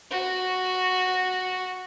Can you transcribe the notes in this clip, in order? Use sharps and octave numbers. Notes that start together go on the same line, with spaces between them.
F#4